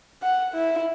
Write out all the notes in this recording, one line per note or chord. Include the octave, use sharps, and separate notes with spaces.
F#5
E4